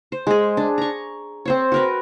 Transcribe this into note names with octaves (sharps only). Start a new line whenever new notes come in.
C5
G#3 G#4
D4
A#5 C#6
C4 C5 C#5
F#4 A#4 B4